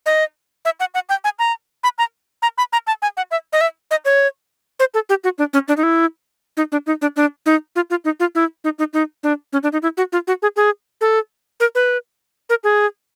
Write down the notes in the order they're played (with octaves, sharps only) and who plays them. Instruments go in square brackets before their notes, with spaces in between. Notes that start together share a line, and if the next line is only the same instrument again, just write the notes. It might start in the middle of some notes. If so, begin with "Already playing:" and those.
[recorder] D#5
E5
F#5
F#5
G5
G#5
A#5
B5
A#5
A#5
B5
A#5
A5
G#5
F#5
E5
D#5
E5
D#5
C#5
C5
A4
G4
F#4
D4
C#4
D4
D#4
E4
D#4
D4
D#4
D4
D4
D#4
F4
F4
D#4
F4
E4
D#4
D#4
D#4
D4
C#4
D4
D#4
E4
F#4
F4
F#4
G#4
G#4
A4
A#4
B4
A#4
G#4